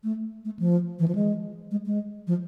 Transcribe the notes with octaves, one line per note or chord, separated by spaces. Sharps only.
A3
A3
F3
E3
F3
G#3
G#3
G#3
F3